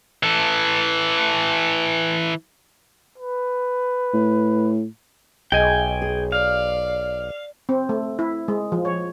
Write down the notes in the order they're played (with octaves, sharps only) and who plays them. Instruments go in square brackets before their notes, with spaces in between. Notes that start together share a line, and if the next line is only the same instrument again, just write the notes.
[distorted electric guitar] E3 A4
[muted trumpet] B4
[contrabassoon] A2
[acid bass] B1 [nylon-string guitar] G#4 D#5 [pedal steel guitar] G5 G#5
[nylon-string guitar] G#4
[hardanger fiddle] D5 [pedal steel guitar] F5
[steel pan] C4
A3
E4
G#3
F3
C#5